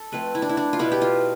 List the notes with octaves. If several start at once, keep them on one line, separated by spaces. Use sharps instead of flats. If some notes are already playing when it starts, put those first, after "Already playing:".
Already playing: A4
F3 A3 C4 B4
E4
D4
E4
D4
F4
B2 B3 D4 E4
G4
F4